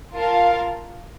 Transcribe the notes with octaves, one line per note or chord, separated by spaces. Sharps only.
F4 A#4 F5 A5